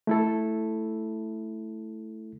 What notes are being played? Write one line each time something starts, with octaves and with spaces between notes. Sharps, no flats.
A3 E4 A4